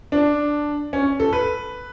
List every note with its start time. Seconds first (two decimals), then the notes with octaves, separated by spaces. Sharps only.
0.12 D4
0.93 C#4
1.20 A4
1.33 B4